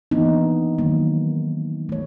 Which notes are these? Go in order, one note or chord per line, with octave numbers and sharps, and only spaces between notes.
E3 A#3 B3 D4 D#4
D#3 F#3 G#3 A#3
A3 C#5